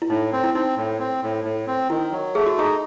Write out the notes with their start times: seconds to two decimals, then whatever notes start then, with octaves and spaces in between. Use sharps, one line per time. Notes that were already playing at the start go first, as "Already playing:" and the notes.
0.02 E4
0.09 A2 D#4
0.33 C4
0.44 E4
0.54 C4 D#4
0.77 A2
1.00 C4
1.22 A2
1.44 A2
1.67 C4
1.90 D#3 E4
2.12 F#3
2.35 A3 G#4
2.47 F#4
2.57 D#4 G#4